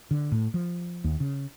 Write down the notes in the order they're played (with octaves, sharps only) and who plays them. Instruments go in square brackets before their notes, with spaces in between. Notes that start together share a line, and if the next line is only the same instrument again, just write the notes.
[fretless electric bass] D3
A2
F3
D#2
C#3